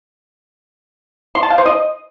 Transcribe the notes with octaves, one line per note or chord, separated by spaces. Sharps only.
C6
A5
F5
C5
D#5